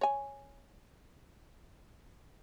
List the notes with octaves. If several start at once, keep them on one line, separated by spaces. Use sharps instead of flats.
C#5 G#5